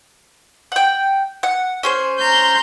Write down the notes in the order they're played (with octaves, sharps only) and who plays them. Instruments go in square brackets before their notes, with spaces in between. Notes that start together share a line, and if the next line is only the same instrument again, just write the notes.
[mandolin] F#5 G5
F#5
C#4 G#4 C5
[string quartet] A#5 C6 G6